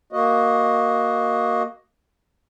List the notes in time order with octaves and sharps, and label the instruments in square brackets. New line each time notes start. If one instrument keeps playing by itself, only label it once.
[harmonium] A#3 F#4 D#5